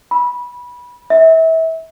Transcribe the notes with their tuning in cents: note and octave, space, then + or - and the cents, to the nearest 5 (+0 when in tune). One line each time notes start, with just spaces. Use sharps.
B5 -20
E5 -30